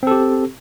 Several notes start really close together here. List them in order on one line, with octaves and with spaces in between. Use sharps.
C4 A4 G4